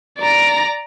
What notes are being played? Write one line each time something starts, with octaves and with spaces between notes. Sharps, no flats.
D5 A#5